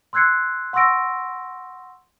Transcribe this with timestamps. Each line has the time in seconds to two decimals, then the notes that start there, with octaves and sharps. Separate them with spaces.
0.13 C6 E6 F#6 G#6 C7 C#7
0.73 F#5 C6 C#6 E6 A#6 D7